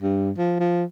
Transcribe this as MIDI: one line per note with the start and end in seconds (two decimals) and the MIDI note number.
0.02 0.31 43
0.38 0.60 53
0.60 0.84 53